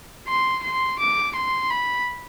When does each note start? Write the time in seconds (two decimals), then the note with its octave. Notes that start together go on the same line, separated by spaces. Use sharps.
0.28 C6
0.63 C6
0.99 D6
1.35 C6
1.71 B5